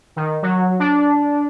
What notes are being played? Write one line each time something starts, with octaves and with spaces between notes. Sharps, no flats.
D#3
F#3
D4